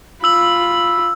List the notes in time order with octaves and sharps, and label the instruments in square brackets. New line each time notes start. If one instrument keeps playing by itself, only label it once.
[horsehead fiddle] F4 B5 [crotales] E6 F#7